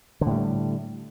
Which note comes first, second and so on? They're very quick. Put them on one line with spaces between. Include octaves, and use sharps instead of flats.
D3 A2 G3